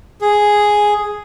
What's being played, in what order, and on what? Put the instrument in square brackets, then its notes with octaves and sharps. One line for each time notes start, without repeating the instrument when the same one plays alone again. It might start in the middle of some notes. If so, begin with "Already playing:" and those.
[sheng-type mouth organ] G#4